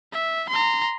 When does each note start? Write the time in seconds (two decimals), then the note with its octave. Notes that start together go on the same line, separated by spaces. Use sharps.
0.13 E5
0.49 A#5 C6